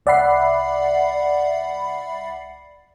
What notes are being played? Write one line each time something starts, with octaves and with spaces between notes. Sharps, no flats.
C2 D5 E5 F#5 B5 C7